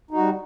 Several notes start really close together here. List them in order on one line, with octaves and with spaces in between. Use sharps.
D#4 F#4 G3